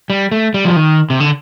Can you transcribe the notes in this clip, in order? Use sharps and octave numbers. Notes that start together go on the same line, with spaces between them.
G3
A3
G3
F3
D#3
C3
D3